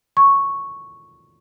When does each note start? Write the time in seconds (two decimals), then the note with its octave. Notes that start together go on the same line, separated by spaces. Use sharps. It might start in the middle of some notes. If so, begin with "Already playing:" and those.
0.17 C#6